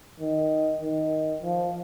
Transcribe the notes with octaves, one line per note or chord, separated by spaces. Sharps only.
D#3
D#3
F3